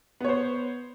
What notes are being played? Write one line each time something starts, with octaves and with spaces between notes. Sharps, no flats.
B3 C5 C#5